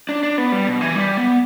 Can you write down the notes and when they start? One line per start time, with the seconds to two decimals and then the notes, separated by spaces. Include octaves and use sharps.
0.09 D4
0.23 D4
0.38 B3
0.52 G3
0.67 B2
0.81 E3
0.95 G3
1.17 B3